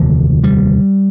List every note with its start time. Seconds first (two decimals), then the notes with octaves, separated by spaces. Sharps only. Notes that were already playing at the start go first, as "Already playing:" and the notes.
Already playing: F1 D#2 D3
0.44 G3